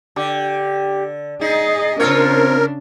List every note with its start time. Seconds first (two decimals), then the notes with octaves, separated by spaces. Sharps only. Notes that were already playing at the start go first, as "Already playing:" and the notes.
0.16 D3 G4
1.41 D#4 G#4 D#5 A6
2.00 C#3 C4 D4 F4 A#4 C#5